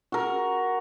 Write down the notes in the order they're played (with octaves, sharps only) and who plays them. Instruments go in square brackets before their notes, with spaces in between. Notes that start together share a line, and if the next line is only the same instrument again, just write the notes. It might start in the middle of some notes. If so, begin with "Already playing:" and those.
[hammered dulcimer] F#4 A#4